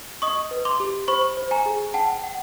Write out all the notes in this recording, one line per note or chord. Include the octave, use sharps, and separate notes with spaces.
D#5 C#6 D#6
B4
C6 D6
G4
C5 B5 C#6
C5
G#5 A#5
G#4
F#5 G5 A5
F#5